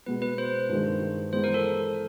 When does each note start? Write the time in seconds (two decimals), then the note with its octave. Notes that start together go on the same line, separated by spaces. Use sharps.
0.06 B2 G#3 B3 B4
0.22 B4
0.38 C5
0.69 G2 D#3 G#3
1.32 E3 G#3 B3 C5
1.44 A#4
1.54 A4